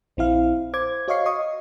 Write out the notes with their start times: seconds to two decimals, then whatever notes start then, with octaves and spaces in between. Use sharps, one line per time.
0.17 A#1 C4 E4 F5
0.74 C5 D6 G#6
1.08 F#4 C#5 D#5 F5 C#6 C7
1.26 D#5 C#6 D#6